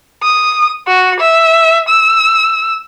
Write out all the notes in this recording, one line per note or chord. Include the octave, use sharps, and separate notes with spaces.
D#6
F#4
E5
E6